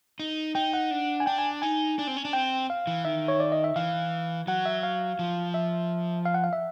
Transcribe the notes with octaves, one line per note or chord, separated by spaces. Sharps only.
D#4
D#4 G5
F#5
D4
G#5
D4 G5
G#5
D#4 G#5
D4
C4
C#4
D4
C4 G5
F5
E3
D#3 E5
C#5
D5
D#5
E5
E3 F5
F#3 F#5
E5
F5
F3
E5
F5
F#5
F5
E5